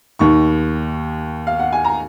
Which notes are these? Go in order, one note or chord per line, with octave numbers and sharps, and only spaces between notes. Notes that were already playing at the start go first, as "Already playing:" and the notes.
D#2 D#3 C#6
F5
F#5
G#5
A#5